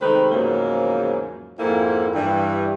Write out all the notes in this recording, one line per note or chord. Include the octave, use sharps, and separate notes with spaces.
C3 D#3 G#3 A3 B4 C5
E2 G#2 C#3 F3 F#3 A#3
F2 G#2 A#3 E4
G2 E3